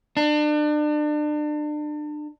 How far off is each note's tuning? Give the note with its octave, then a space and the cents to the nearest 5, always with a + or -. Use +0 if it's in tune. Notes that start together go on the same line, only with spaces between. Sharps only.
D4 +35